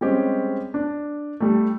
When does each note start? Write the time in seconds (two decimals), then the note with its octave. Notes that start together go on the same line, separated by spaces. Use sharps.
0.01 G3 G#3 C4 C#4 G4
0.74 D4
1.40 G3 A3